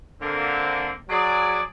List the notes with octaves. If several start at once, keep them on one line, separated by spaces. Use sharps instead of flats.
D3 A#3 C4
F#3 G#4 D5